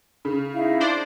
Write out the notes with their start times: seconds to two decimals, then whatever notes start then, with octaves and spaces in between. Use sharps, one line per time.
0.25 C#3
0.52 D#4 E4 F5
0.81 D4 C5 D5